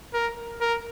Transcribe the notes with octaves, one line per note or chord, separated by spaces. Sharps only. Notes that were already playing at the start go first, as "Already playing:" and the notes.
A#4
A#4